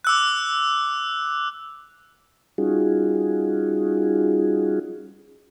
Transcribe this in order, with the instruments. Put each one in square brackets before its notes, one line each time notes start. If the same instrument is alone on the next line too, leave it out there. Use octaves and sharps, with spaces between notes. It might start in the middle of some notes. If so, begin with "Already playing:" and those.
[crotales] D6 E6 F#6
[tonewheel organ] G3 C#4 D#4 F4 F#4 G#4